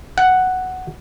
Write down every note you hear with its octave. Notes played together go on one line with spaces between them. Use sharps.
F#5